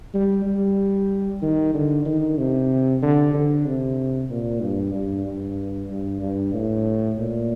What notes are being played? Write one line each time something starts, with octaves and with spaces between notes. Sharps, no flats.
G3
G3
D#3
D3
D#3
C3
D3
D3
C3
A#2
G2
G2
G2
G2
G2
A2
A#2